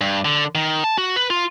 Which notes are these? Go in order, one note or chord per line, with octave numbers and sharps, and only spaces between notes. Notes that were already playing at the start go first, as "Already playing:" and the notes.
G2
D3
D#3
A5
F#4
B4
F4